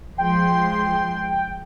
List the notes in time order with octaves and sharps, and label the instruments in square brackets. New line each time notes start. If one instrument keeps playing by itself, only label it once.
[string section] F3 G#3 C6 [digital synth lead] G5